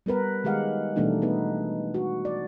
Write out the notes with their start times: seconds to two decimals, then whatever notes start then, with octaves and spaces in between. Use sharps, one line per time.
0.06 G3 B3 A#4 B4
0.44 D#3 G#3 G4 F5 F#5
0.96 B2 E3 G3 A3 D4 D#4
1.22 B3 D#4 B4
1.94 F#4
2.25 D5